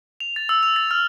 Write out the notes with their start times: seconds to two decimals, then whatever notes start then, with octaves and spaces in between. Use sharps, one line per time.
0.20 F7
0.36 A6
0.49 E6
0.63 F7
0.76 A6
0.91 F6